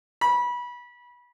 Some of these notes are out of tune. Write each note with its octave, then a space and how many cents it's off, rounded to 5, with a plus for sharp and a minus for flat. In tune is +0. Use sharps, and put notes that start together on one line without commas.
B5 -25